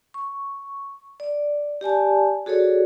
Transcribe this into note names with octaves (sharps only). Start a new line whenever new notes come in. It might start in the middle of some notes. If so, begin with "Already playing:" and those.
C#6
D5
G4 D5 G#5 A5
F#4 G#4 A4 C#5 D5